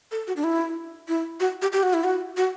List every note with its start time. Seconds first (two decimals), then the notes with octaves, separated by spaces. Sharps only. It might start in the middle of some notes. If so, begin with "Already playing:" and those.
0.11 A4
0.27 F#4
0.36 D4
0.44 E4
1.08 E4
1.40 F#4
1.62 G4
1.72 G4
1.83 F#4
1.94 E4
2.04 F#4
2.37 F#4